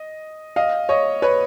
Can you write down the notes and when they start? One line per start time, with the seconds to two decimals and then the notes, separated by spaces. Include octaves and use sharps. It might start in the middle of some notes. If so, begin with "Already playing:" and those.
Already playing: D#5
0.56 D#5 F5
0.89 C#5 D#5
1.22 B4 C#5